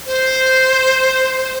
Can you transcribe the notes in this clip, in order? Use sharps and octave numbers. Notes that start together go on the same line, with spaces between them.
C5